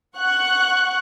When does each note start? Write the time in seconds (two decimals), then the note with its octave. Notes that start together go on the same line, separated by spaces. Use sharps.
0.17 F#5 C#6 F#6